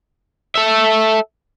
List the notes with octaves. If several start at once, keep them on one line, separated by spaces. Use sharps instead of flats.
A4 E5